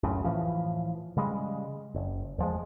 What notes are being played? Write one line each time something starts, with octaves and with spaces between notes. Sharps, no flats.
C#2 F#2 A2 C#3
A2 E3 F3
C#3 G3 G#3
F#1
E2 F3 G#3